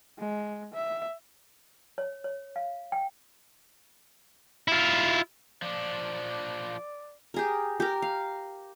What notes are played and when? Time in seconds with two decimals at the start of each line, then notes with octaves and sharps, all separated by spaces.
0.19 G#3
0.74 E5
1.98 C#5
2.24 C#5
2.56 F5
2.92 G5
4.68 E4 F4
5.62 F3 D4 D5
7.34 G4 G#4 A#4
7.80 G4 A#4
8.02 F5